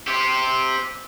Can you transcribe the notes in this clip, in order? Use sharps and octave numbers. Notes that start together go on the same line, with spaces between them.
C4 G4